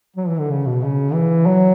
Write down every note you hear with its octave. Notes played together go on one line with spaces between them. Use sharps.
F#3
E3
D3
C#3
B2
C#3
E3
F#3